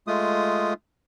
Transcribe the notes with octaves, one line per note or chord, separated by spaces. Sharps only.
G#3 A3 F4 D#6